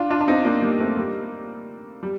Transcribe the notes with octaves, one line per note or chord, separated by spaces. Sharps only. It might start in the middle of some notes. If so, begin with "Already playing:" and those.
Already playing: D4 F4
D4 F4
D4
C4 D#4
A#3 D4
G3 A#3
A3 C4
G3 A#3
G3